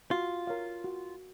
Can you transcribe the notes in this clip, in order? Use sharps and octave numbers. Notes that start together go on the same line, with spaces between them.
F4 F#4
A#4 C#5 F5
F#4